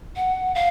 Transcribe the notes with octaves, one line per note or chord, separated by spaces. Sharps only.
F#5
F5